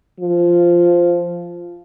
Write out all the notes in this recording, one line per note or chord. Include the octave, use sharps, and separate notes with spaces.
F3